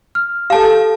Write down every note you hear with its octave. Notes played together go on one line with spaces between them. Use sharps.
F6
G4 A4 F5 A5